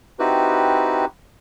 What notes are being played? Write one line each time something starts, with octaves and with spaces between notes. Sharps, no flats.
C4 D#4 E4 F#4 G4 B4